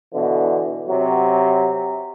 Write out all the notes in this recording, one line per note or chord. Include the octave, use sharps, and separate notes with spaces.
B2 D3 E3
C3 F#3